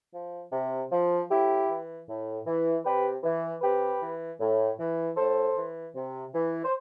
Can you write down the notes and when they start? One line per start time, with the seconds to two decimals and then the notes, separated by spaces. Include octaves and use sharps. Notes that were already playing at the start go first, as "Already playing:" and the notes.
0.13 F3
0.52 C3
0.90 F3
1.29 A2 E4 G4
1.68 E3
2.07 A2
2.45 E3
2.84 C3 G4 B4
3.23 E3
3.62 C3 G4 B4
4.00 E3
4.39 A2
4.78 E3
5.17 A2 A4 C5
5.56 E3
5.94 C3
6.33 E3
6.64 C5